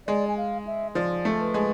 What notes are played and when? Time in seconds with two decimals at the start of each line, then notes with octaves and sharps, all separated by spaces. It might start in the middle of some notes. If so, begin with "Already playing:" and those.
0.07 G#3 D5
0.28 G#5
0.37 F5
0.67 E5
0.95 F3 D5
1.25 A3
1.40 B4
1.54 G#3